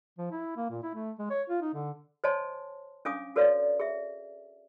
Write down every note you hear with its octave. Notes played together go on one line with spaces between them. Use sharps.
F3
E4
A#3
A#2
E4
A3
G#3
C#5
F4
D#4
D3
C5 C#5 D#5 G#5 A5 C6
C#4 D4 F5 G#5 D6 D#6
F#4 A4 B4 C#5 D5 F5
G#4 E5